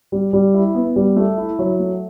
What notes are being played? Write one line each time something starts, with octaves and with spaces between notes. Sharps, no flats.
G3
G3
E4
B3
G3
A3
E4
F#3
A3